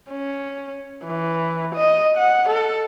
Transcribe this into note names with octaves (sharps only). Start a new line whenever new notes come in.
C#4
E3
D#5
F#5
A4